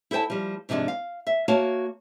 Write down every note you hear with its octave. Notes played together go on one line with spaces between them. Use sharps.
E4 A4 C5 G5 A5
F3 G3
G#2 C3 F3 G#3 D4
F5
E5
A#3 F#4 C#5 F5 A5